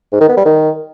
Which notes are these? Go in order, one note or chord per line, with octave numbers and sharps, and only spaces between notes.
G#2
D#3
B3
G3
D#3